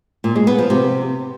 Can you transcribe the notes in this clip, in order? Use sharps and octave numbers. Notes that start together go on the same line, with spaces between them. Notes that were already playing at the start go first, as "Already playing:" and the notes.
A#2
G#3
B3
F3
C3